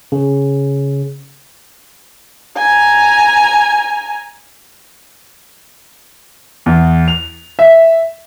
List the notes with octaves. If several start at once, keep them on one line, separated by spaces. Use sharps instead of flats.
C#3
G#5 A#5
E2
F7
E5